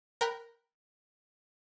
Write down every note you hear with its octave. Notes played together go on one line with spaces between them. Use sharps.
A#4 G5 B5 F#6